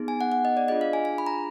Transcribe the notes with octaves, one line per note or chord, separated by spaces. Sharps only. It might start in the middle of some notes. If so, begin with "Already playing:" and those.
Already playing: B3 D#4 G#4
G#5
F#5
F#5
D#5
D5
D4 F4 G#4 D#5
F5
G#5
G#5
B5
A#5